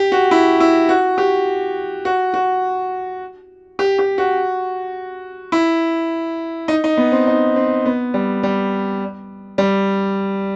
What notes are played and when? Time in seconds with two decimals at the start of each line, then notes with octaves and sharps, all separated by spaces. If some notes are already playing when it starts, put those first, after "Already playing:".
Already playing: G4
0.12 F#4
0.31 E4
0.60 E4
0.89 F#4
1.18 G4
2.05 F#4
2.34 F#4
3.79 G4
3.99 G4
4.18 F#4
5.52 E4
6.68 D#4
6.84 D#4
6.97 B3
7.12 C4
7.27 D#4
7.56 C4
7.85 B3
8.14 G3
8.43 G3
9.58 G3